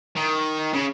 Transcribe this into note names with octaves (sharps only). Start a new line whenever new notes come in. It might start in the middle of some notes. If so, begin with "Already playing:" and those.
D#3
C#3